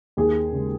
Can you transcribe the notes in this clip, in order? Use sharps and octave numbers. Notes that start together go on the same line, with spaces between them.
D#2 G#4
C#3 G#3